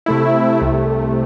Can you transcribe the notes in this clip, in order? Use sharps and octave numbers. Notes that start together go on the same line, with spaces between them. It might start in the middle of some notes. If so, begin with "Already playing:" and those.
C3 A3 E4
C2 C3 A3